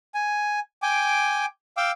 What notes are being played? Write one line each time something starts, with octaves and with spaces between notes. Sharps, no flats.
G#5
G5 G#5 D6
F5 G5 D6 E6